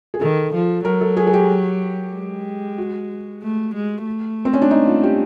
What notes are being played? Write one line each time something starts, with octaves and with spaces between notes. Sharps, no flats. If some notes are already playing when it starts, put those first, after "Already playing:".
G#4
D#3 A4
F3
F#3 A#4
A4
G#4
G#4
G4
G#3
F#4
A3
G#3
A3
C4
C#4
D4
D#4
F4
G4